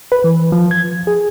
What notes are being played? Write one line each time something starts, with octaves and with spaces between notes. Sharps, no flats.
B4
E3
F3
G#6
G#4